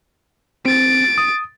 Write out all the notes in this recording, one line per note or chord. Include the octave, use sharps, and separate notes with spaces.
C4 A6 D7
D#6